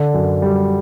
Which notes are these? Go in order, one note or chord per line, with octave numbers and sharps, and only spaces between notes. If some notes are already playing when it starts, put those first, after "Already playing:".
Already playing: D3
F#2
G3